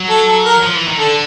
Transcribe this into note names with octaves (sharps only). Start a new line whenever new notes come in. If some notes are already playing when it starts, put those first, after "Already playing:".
Already playing: F#3
A4
A4
A#4
F3
E3
D#3
D3 A4